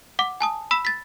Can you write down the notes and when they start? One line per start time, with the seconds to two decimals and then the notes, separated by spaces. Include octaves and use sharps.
0.19 F#5 D6
0.41 G#5 A5 D#6
0.71 B5 E6 B6 E7
0.85 A6 B6